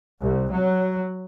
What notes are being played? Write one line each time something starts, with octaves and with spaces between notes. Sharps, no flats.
C2
F#3